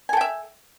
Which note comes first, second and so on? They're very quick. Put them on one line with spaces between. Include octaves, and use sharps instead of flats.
G#5 A4 G5 E5